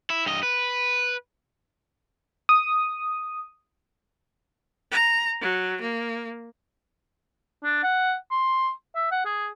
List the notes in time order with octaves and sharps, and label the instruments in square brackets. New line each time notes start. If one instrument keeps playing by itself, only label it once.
[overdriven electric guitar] E4
G2 D#5
B4
[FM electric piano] D#6
[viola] A#5
F#3
A#3
[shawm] D4
F#5
C6
E5
F#5
G#4